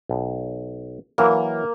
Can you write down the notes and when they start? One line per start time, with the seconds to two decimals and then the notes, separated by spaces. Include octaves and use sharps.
0.09 B1
1.18 E3 F#3 A#3